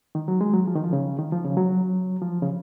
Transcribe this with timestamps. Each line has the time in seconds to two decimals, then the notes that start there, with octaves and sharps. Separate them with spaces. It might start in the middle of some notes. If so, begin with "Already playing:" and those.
0.15 D#3
0.28 F#3
0.41 G#3
0.53 F#3
0.67 F3
0.75 D#3
0.83 F3
0.93 C#3
1.18 D#3
1.32 F3
1.45 C#3
1.57 F#3
2.22 F3
2.42 C#3